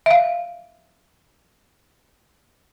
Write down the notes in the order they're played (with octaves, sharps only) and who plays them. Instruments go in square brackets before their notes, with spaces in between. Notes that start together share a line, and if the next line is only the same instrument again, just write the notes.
[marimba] E5 F5